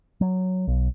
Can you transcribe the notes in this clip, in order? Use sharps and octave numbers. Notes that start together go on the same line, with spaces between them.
F#3
B1